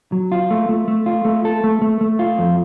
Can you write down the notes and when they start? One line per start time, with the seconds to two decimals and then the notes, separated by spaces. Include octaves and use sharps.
0.12 F#3
0.32 F4
0.51 A3
0.69 A3
0.88 A3
1.06 F4
1.25 A3
1.45 A4
1.64 A3
1.82 A3
2.01 A3
2.19 F4
2.39 F2